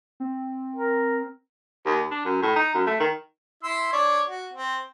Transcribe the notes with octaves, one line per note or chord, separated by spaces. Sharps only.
C4
A#4
D#2
D4
F#2
A2
D#4
F#2
A3
D#3
E4 C6 E6
D4 C#5 D5
F#4
C4